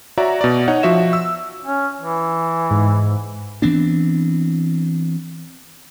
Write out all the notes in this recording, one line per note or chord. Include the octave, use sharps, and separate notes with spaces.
F#4 C#5 D5 E5 A#5
B2 D5
D#4 C#5 D#5 F#5
F3 F#4 E5 E7
E6
C#4
E3
G#2
E3 B3 C4 D4